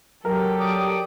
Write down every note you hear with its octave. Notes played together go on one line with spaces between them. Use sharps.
F#3 G4 A4 A#4
D5 D6 D#6